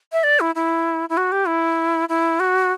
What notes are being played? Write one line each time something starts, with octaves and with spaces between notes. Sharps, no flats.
E5
D5
E4
E4
E4
F#4
G4
E4
E4
F#4